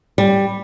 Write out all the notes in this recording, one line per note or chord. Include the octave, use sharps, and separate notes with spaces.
G3